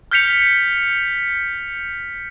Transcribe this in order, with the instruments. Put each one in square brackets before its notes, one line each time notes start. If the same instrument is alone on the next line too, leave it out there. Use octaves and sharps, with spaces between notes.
[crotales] F6 G6 B6 C#7 F7